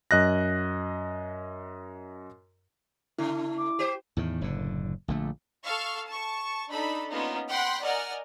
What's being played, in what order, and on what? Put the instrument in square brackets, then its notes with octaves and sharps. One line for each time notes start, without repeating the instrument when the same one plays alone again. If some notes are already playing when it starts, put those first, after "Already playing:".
[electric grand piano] F#2 D#5 F#6 A#6
[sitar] C#3 A3 [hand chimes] E4
[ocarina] D6
[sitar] G4 C5
[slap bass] E2 A2 D#3
F#1 A2 D3
A#1 D3 A3
[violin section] A4 F5 C#6
A5 C#6
D4 D#4 A4 B5
A#3 B3 C#4 D#4 F4
F#5 G5 B5 C6 F#6
A#4 D5 D#5 F#5 G#5 F6